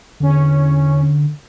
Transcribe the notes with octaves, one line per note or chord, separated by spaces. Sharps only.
E2 D3 C#4